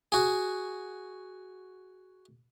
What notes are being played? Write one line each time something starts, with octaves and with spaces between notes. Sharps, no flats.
F#4 G#4